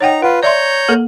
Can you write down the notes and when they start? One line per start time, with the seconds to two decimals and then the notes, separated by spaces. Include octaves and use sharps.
0.01 D#4 C#5 F#5 G5 A#5
0.22 F4 B4 F#5
0.43 C#5 D5 E5 A#5 C6 G6
0.89 A#3 A4 A#4